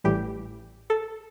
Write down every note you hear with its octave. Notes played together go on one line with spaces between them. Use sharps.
A1 A2 E3 G3 G4
A4